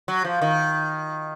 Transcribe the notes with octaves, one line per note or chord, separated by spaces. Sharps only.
F#3
F3
D#3